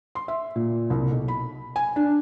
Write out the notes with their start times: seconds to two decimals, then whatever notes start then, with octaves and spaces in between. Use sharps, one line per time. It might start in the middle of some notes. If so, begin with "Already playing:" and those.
0.15 C6
0.28 E5
0.56 A#2
0.90 C2
1.11 B1
1.28 B5
1.76 G#5
1.96 D4